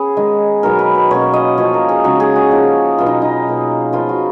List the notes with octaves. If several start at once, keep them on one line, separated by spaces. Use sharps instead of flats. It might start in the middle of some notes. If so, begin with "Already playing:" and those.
Already playing: B3 C#4 G#4
D#3 G#3 D#4
B2 F#3 B3 D#4 A#4
B4
B4
B2 A#3 C#4 C#5
D#5
F3 A#3 C#4 C#5
A#4
G#4
C#3 G#3 D#4 F#4
G#4
F#4
F3 A#3 D#4
B2 F#3 B3 F4
D#4
D#4
B2 A#3 D#4
F3 B3 D#4 F4
F#4